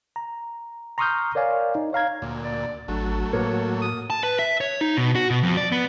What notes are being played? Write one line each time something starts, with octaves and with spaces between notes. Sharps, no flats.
A#5
A#5 C6 C#6 D#6 F6 G6
A#4 C#5 D5 F5 G#5
D#4
C#5 F5 A#5 G#6
D2 A#2
D5
G#1 F#3 A3 D4
A2 A#3 C#5
D#6
A5
B4
E5
C#5
D#4
B2
F#4
B2
F2
D5
B3